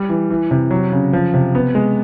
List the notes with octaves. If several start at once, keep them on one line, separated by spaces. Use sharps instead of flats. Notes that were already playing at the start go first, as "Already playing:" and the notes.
Already playing: G3
E3
E3
C3
F#3
C#3
F3
C3
B3
G#3